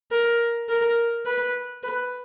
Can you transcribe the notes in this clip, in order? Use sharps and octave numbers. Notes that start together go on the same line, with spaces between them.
A#4
A#4
B4
B4